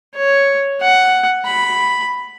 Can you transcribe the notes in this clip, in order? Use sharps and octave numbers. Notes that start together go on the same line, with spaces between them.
C#5
F#5
B5